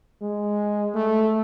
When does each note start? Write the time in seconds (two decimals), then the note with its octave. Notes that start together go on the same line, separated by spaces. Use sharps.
0.21 G#3
0.95 A3